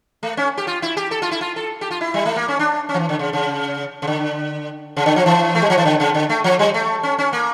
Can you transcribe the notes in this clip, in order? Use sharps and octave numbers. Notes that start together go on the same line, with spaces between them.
A3
C#4
G4
F4
E4
G4
A4
F4
E4
F4
A4
G4
F4
E4
G3
A3
A#3
C#4
D4
C#4
F3
E3
D3
C#3
C#3
C#3
D3
C#3
D3
F3
E3
A3
G3
F3
E3
D3
C#3
D3
A3
F3
G3
A3
C#4
C#4
A#3